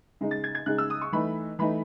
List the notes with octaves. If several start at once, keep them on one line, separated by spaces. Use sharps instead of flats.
C#3 G#3 D#4
A6
G#6
G#6
C#3 G#3 D#4 F#6
E6
D#6
C#6
E3 A3 D#4 B5
E3 A3 D#4 B5